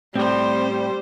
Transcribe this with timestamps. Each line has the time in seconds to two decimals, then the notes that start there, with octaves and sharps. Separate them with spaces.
0.16 A2 G3 C4 G4 C5